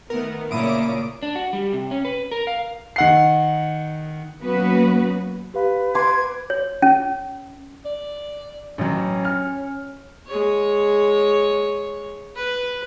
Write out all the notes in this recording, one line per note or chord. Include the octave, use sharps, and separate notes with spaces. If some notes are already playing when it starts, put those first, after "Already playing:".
D#3 A3 B3 A#4
A#2 C#3 C#4 E4 D6 D#6 D7
D4
F#4
G3
C3
C#4
B4
A#4
F5
D#3 F#5 C7
F#3 A#3 B3 C#4 F#4 B4
G4 B4 F5
C6 D6 G#6
C#5
C#4
D5
A1 F#3 C#4
F6
G#3 C#5
B4